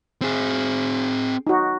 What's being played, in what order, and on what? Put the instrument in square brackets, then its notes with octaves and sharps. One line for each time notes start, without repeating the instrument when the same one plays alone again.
[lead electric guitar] C4 G#4
[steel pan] D#4 F#4